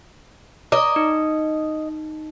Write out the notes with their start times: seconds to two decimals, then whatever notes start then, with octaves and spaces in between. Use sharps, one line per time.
0.72 D5 D#5 A#5 D6
0.96 D#4